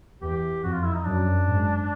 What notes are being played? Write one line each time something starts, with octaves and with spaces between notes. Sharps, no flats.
E2 G4
F2 F#4
F4
E4
D#4
F#2 D4
G#2